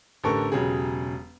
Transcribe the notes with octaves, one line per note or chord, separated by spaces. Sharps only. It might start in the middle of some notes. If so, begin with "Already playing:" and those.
A1 D3 G4 A4 A#4 C#6
E1 C#3 F#3 G4 G#4